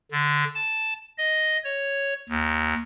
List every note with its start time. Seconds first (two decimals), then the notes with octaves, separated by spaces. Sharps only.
0.12 D3
0.55 A5
1.18 D#5
1.64 C#5
2.29 D#2